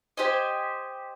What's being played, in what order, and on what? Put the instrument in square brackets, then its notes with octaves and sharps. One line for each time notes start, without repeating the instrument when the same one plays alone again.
[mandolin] G4 C5 D#5 G#5